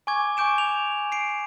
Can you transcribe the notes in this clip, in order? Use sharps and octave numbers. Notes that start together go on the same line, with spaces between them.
G#5 C#6 D6 G#6
G#5 C#6 D6 G6 D7 E7
F7
C7 D7